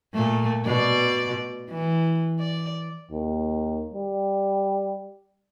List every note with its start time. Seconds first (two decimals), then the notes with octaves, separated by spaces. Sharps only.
0.14 A#2 A3
0.66 B2 D5
1.70 E3
2.39 D5
3.11 D#2
3.94 G3